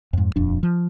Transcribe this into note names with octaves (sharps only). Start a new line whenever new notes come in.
F2 G#2
D#1 F2 D4
F3